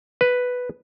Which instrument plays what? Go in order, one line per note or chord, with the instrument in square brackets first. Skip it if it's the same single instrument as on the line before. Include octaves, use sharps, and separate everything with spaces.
[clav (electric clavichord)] B4